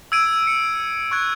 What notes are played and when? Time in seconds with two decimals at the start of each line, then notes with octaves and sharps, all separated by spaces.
0.12 E6 G#6 D7 D#7
0.47 C#7
1.11 C#6 F#6 G#6